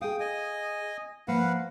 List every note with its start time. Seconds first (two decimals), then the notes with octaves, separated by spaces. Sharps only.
0.01 G#4 F5 G5 D#6
0.20 D#5 G#5
1.28 F3 A#3 B4 F5 F#5